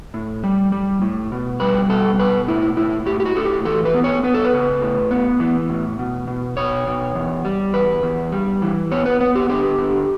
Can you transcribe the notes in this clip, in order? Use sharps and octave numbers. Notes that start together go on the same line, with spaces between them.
A2
G3
G3
A2
B2
G3 B4
B2 A4
B2 B4
A2 E4
A2 E4
A2 G4
G4
F#4
A2 A4
G4
E3 A4
B4
B3
C#5
B3 B4
A4
B4
C#3
A2
B3
E3
A2
B2
B2
B2 C#5
B2
E2
G3
E2 B4
E2
G3
E3
B3 C#5
B4
B3 B4
G4
D3 G4
D3